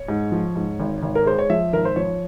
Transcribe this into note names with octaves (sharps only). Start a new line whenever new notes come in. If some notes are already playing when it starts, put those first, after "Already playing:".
Already playing: C#5
G#2
F3
G#2
G#1
G#1
A#4
G#3 C5
C#5
F3 E5
G#1 A#4
C5
F3 C#5